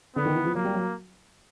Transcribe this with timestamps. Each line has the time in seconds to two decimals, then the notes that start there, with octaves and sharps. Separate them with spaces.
0.16 D3 B3
0.26 D#3
0.35 E3
0.45 F3
0.54 F#3 A#3
0.65 G3
0.74 F#3